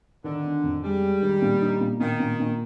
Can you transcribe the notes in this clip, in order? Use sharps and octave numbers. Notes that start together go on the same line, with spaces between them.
D3 D#3
D4
F2
G3 G#3
G#3
D#3
A#2
D#4
A#2
A#2 D#3
A#2
A#2